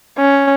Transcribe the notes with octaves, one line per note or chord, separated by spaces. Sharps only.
C#4